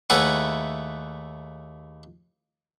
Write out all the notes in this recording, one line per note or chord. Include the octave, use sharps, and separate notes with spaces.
D#2 A3 E4 G#4 B4 F#5